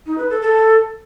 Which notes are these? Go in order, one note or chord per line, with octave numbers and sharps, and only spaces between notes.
D#4
B4
A4
A4